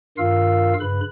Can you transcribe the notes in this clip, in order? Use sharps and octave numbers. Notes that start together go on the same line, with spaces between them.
G2 D#3 F4 A#4 F5 E6
G2 C#3 B4 B5